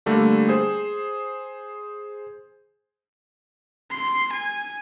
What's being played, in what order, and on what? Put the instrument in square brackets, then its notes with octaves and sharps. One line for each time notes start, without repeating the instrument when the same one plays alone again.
[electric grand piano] D3 G3 A3 A#3
G#4 C5
[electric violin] C6
G#5